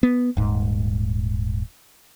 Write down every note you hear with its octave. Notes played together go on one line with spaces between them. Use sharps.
B3
D#1 G#2